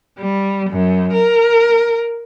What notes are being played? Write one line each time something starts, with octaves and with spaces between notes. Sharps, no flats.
G3
F#2
A#4